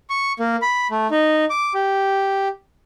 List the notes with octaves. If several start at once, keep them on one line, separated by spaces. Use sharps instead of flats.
C#6
A#3
B5
A3
D#4
D6
G4